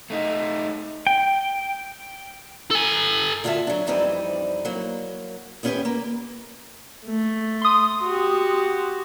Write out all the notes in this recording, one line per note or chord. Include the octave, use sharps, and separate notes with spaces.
A3 D#4
G5
A4 G#5
D3 F4 F#4 A4 E5
F#3 D4
F2 E3 G3 C4 D4 D#4
F#3 A#3
D#2 B3 C#4 F4 G4 B4
A#3
A3
C6 D#6
F#4 G4